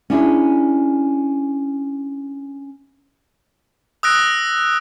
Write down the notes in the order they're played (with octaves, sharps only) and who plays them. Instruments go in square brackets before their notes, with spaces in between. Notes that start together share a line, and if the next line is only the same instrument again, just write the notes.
[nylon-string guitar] C#4 D4 E4 G#4
[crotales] D#6 E6 F#6 A#6 D7